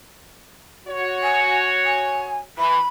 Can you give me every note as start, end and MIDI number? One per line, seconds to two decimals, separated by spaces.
0.88 2.47 66
0.88 2.47 73
1.23 1.63 80
1.84 2.36 80
2.58 2.77 52
2.58 2.88 83